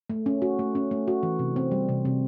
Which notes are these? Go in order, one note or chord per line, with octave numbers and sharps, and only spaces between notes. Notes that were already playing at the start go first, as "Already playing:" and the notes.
A3
C#4
F#4
A3
C#4
A3
F#4
E3
C3
C4
G3
C3
C3